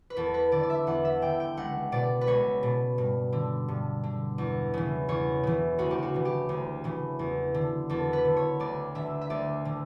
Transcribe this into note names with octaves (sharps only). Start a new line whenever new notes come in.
B4
E2 A4
B4
D3 D5
D5
E5
E2 F#5
E5
D3 G5
G5
C#2 F#5
B2 D5
B4
C#2 C#5
B2
G2
D3
G2
D3
E2
C#3 E3
E2 C#5
C#3 E3
D2 F#4
G4
F#4
C#3 E3
G4
D2
C#3 E3
E2
D3
E2 A4
B4
D3
C#5
D2 D5
D3 E5
E5
D2 D5
D3